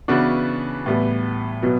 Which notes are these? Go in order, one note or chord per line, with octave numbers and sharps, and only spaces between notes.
C#3 E3 B3 D4 F#4
A2 E3 G3 B3
B2 F#3 B3